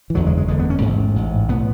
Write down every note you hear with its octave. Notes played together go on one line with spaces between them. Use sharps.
E3
F#1 E2 D3 F#3
G#3
G#3
F#1 E2 D3 G#3
B3
C#4
A1 G#2
A1 G#2
B1 A2 B3